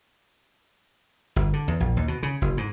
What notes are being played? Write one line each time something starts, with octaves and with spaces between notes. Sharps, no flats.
G1
D3
E2
A#1
D#2
B2
C#3
F#1
G#2